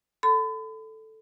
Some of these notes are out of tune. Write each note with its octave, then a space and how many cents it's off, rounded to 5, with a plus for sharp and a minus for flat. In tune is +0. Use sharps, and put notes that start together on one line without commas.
A4 +0 B5 +40